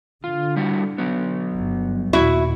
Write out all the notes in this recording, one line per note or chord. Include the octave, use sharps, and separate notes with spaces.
D3 F4
G3 E4 F#4
F#3 B3
G1
D#2 A#2 E4 F#4 E5